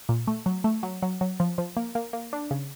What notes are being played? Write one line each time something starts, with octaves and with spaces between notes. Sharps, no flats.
A#2
A3
F#3
A3
F#3
F#3
F#3
F3
F3
A#3
A#3
A#3
D4
C#3